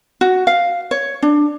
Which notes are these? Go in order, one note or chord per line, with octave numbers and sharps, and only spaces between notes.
F#4
F5
C#5
D4